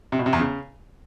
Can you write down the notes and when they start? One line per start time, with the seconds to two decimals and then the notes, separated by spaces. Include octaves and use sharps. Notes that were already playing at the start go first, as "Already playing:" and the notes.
0.12 C3
0.19 B2
0.26 C3
0.33 E2
0.40 C#3